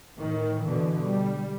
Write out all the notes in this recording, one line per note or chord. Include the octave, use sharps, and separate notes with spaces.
A2 D#3
B2 D3 E3
G3